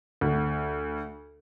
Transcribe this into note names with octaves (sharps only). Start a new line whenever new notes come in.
D2